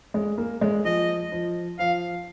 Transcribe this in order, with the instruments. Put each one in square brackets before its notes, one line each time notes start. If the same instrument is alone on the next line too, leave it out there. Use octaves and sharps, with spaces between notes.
[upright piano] G#3
A#3
G#3
[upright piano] F3 [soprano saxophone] D#5
[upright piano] F3
[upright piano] F3 [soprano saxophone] F5